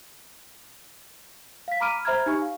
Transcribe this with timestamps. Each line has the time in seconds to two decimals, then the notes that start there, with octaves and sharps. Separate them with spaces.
1.68 F5 B6
1.80 A#5 B5 D6 F6 D7 D#7
2.05 C5 E5 A#5 B5 F6 G#6
2.26 D#4 G4 G#5 C#6
2.42 F5